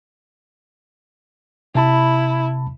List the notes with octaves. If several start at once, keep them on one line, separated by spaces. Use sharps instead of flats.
C3 E4 A5 B5